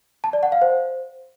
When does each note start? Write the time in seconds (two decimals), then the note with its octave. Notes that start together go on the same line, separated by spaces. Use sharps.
0.24 A5
0.33 D5
0.43 F#5
0.52 F5
0.62 C5